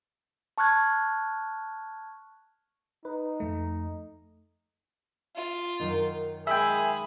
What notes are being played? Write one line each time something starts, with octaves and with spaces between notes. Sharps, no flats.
A5 C#6 F6 F#6 G#6
D#4 B4
F2 A3
F4
F#2 D#3 D#4
G#3 G#4 E5 G5 B5